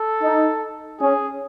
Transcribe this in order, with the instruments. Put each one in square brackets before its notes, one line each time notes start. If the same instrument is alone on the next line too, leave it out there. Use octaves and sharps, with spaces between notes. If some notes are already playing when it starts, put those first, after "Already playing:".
Already playing: [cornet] A4
[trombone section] D#4
[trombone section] C#4 [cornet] G#4